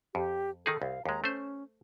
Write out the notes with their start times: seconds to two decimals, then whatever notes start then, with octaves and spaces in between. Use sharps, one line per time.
0.15 F2 G4
0.66 D#3 D#4 G#4 A4
0.82 C2 F5
1.05 D#2 G#3 A#5
1.24 A3 C#4 C5